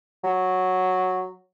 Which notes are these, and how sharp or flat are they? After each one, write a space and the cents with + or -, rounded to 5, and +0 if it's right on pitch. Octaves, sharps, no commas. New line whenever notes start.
F#3 -5